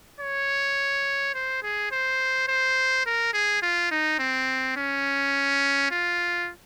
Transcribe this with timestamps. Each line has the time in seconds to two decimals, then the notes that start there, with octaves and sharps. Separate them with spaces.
0.20 C#5
1.35 C5
1.63 G#4
1.92 C5
2.48 C5
3.06 A#4
3.34 G#4
3.63 F4
3.91 D#4
4.19 C4
4.77 C#4
5.91 F4